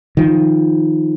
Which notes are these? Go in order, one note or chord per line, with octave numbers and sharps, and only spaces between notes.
D#3 F3